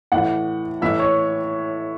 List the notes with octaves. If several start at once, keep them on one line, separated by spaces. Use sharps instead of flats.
A2 E3 F#5
A2 E3 E5
C#5